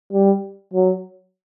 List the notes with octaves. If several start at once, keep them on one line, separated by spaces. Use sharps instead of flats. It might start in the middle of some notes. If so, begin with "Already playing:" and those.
G3
F#3